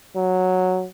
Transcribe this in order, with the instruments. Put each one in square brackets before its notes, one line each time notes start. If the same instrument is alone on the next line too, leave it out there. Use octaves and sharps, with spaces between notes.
[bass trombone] F#3